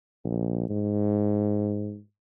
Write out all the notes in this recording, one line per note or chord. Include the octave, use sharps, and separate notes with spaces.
A#1
G#2